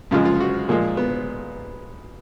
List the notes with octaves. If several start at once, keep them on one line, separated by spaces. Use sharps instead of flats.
F#2 C#3 F3 G#3 F4
F4
F#4
A#2 F3 G#3 A#3
B3